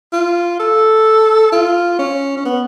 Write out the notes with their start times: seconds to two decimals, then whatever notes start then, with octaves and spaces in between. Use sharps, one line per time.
0.13 F4
0.60 A4
1.52 F4
1.99 C#4
2.37 C#4
2.45 B3